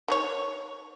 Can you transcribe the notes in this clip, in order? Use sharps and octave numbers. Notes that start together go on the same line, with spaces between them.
D#3 G#4 C#5